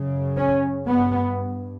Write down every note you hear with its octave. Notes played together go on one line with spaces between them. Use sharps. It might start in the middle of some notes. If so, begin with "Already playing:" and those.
Already playing: F#2 C#3
C#4
G2 B3